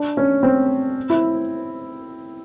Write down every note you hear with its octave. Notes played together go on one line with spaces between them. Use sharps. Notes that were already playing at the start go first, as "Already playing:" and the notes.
Already playing: D4
C#4
C4
E4